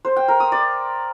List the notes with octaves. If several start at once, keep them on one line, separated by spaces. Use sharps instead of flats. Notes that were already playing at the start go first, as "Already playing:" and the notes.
C5
G5
A#4
D#6
D5